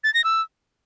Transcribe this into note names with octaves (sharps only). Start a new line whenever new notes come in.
A6
A#6
E6